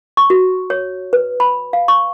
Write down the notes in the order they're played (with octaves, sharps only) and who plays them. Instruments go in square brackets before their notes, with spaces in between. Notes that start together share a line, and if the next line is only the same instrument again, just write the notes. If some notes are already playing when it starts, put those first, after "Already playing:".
[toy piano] C#6
F#4
C#5
B4
B5
F5
C#6